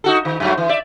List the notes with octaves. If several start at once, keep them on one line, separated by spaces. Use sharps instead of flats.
D#4 F#4 A4
D#3
G2 F#3 A3
E3
D5 E5